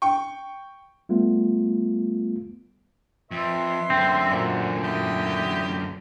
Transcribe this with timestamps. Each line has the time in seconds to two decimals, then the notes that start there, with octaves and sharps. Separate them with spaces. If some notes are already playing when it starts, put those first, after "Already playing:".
0.02 G5 C#6
1.09 G3 A3 B3 F4
3.31 F2 B4 E5 C6
3.90 F#2 D3 C4
4.32 A#2 F#4 C5
4.83 E4 F#4 G4 D#6